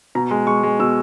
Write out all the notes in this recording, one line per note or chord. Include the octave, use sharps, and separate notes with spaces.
B2 A#5
G#3
G#3 C#6
G#3
B2 E6